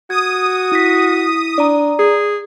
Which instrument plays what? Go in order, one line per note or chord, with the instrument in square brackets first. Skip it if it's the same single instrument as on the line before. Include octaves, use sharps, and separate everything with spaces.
[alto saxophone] F#4 [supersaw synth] D#6 [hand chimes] G#6
[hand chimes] E4 A#6 B6
[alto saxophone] D4 [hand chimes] D5 A#5
[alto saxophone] G#4